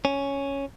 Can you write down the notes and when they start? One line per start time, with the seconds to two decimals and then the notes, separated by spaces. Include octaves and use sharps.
0.05 C#4